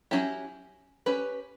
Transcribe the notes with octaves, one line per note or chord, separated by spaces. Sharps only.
F#3 C#4 E4 G4
C#4 G4 B4